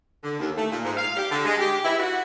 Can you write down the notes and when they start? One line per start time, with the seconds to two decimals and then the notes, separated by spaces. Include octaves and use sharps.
0.23 D3
0.38 D#2
0.57 A3
0.71 A#2
0.84 G#2
0.97 F5
1.17 G4
1.30 D3
1.45 G#3
1.59 G4
1.84 E4
1.99 F#4